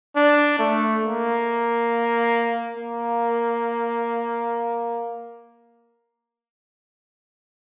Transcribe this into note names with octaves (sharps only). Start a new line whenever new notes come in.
D4
A3
A#3
A#3